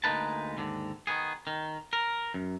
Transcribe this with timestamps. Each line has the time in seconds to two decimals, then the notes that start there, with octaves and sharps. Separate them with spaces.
0.04 D2 G#3 A#3 D#4 B4 A5
0.57 D#2 G#2 D3
1.07 D#3 B3 G#4
1.47 D#3
1.93 A#4
2.34 F#2